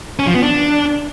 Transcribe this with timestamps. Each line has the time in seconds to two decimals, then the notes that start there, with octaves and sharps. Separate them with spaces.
0.19 C#4
0.27 F3
0.35 B3
0.42 D4